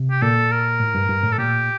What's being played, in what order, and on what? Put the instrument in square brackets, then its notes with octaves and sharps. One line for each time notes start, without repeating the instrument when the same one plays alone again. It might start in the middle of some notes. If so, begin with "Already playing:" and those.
Already playing: [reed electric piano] C3
[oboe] G4
[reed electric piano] A#2 [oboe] A4
[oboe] A#4
[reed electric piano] A2
G2
G2
A2
[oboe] A4
[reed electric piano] A#2 [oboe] G4